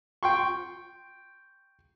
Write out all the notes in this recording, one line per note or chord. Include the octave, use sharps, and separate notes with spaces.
G5 C6 C#6